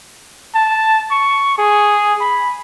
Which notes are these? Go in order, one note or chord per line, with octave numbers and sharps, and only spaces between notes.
A5
C#6
G#4
B5